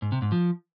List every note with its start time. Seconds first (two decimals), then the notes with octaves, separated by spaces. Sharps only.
0.02 G#2
0.12 C3
0.22 G#2
0.32 F3